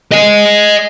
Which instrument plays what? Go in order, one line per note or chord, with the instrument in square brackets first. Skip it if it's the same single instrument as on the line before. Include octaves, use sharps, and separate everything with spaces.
[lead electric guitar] D#5 G#5